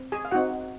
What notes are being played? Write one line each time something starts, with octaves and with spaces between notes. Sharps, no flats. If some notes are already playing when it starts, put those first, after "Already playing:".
Already playing: C4
G#4 G#5
F5
C4 D#4 F#4 F#5